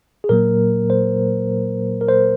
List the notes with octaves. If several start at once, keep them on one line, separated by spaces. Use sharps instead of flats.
G#4
A#2 F#3 A#3 A#4
C5
A#4
C5